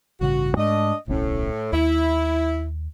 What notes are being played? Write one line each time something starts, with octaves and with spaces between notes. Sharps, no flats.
A1 G2 C#3 F#4
G#2 G#3 A3 D4 D#5
D1 B1 A2 C#4
D#2 E4